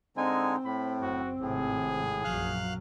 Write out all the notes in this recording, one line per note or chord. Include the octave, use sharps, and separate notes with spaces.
D3 G#3 C4 D#4 G#5
A2 B5
F#1 F#4
G#1 A2 C3 G#4
A#1 F#2 F#3 F5 F6 F#6